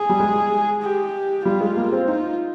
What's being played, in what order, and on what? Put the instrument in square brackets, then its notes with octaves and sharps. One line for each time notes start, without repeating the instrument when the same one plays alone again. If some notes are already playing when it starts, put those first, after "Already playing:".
Already playing: [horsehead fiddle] G#4
[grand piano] G3
G#3
[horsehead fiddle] G4
[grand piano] G3 [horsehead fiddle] F4
[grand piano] G#3
A#3
C4
[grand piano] D#4 [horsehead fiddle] F4